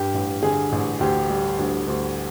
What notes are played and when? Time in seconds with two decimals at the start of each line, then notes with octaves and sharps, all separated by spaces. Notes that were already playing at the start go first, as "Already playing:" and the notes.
Already playing: G2 G4
0.14 A1
0.43 D3 G#4
0.72 A1
1.00 D2 G4
1.30 G3
1.59 D2
1.88 D2